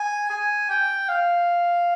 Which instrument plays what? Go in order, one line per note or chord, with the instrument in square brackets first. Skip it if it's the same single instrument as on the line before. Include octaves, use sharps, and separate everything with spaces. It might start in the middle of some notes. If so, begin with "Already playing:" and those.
Already playing: [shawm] G#5
G#5
G5
F5